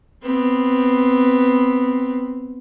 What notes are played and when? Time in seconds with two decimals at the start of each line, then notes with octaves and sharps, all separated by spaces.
0.23 B3 C4